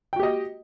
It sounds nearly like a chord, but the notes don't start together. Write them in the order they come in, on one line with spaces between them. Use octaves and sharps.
G5 F#4 G4 D#5